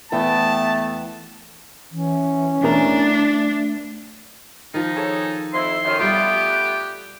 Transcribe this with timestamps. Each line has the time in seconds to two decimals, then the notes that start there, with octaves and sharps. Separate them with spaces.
0.12 E2 A3 B3 G5 A5
1.91 E3 C#4
2.63 E2 A3 D4 A#4 A#5
4.74 D#3 F3 D#4
4.97 G#4 A4 C#5
5.53 F2 E4 C6
5.85 F#2 D#3
5.99 G3 A3 B3 F4 G4